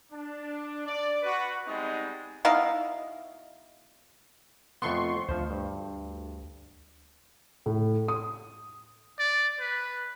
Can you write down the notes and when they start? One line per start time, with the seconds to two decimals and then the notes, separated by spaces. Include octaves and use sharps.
0.12 D4
0.87 D5
1.22 F#4 B4
1.66 G3 G#3 B3 C4 D#4
2.45 B2 D#4 E4 F5
4.82 F2 A3 B3 C6 C#6
5.29 D2 F3 C5
5.50 G2
7.66 A2
8.08 D#6
9.19 D5
9.60 B4